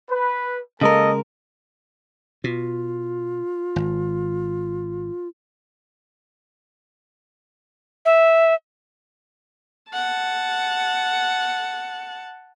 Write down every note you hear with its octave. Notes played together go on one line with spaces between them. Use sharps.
B4
C#3 G#3 A#3 A4 A#4 D#5
B2 F4
G#1
E5
F#5 A5